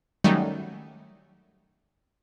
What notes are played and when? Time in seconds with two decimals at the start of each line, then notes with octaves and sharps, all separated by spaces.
0.24 D#3 F#3 G3 A3 C#4 D#4